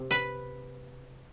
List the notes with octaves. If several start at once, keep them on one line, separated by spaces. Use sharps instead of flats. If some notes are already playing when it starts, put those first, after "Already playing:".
Already playing: C3
B4